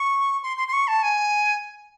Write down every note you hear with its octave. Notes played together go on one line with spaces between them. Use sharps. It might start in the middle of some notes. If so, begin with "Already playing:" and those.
Already playing: C#6
C6
C6
C6
C#6
A5
G#5